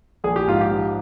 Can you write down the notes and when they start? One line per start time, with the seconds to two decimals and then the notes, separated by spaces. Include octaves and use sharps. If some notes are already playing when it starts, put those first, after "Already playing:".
0.24 A#1 G#4
0.36 G4
0.48 G#2 F4
0.61 G4
0.71 F3